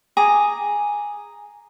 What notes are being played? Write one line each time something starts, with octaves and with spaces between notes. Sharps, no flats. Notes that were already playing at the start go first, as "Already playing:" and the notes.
G#4 G#5 A#5 D6